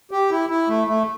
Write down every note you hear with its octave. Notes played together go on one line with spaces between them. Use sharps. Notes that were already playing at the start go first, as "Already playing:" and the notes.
G4
E4
E4
A3
A3